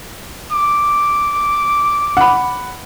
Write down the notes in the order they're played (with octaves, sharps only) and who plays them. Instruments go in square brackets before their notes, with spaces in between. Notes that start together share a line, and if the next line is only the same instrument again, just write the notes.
[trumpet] D6
[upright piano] F#5 B5